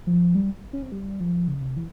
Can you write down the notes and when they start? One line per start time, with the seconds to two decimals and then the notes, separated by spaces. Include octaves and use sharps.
0.07 F3
0.35 G3
0.73 C#4
0.82 C4
0.92 G3
1.20 F3
1.48 C#3
1.62 C3
1.77 E3